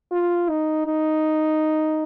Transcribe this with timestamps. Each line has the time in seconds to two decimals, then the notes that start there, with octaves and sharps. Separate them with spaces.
0.12 F4
0.49 D#4
0.87 D#4